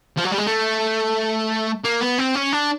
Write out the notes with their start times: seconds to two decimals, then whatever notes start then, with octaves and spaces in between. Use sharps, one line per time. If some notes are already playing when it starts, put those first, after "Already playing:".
0.17 F3
0.24 F#3
0.31 G3
0.38 G#3
0.46 A3
1.84 A#3
2.01 B3
2.18 C4
2.35 C#4
2.53 D4